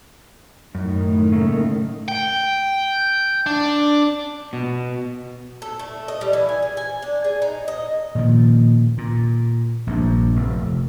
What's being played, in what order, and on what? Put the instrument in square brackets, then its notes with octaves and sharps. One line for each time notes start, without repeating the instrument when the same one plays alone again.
[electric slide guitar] F#2 [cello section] A2 D#3
[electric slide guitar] C#3 A3 A#3
[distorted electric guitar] G5
D4
[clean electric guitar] B2
[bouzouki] A4
A3
D#5
G3
E3
G#5
G#4
G#5
D4
G#4
D#4
D#5
[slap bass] A#2 D#3 F3
A#2
A#1 G2
F1 F2